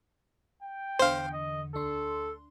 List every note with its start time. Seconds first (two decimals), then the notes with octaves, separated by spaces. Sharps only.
0.62 G5
0.99 E2 D3 C5 F5
1.33 D#5
1.75 D2 D4 A4 C6